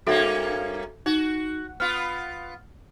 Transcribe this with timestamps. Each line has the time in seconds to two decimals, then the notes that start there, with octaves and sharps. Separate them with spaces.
0.07 G2 A#3 C#4 F#4 A4 E5
1.06 D#4 F#4
1.80 B3 F4 F6